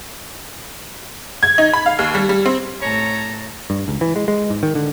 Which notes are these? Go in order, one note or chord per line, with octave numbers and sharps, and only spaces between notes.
G#6
D#4
B5
F5
D#2
G3
G3
C4
A2 A4 C#5 A#5
G2
C#2
E3
G#3
G#3
G#2
D#3
D3